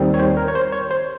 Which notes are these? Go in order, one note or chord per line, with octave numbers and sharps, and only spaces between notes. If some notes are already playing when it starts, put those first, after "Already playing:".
Already playing: D#2 D#3 G3 C4
C#5
C5
A#4
C#5
C5
C#5
C5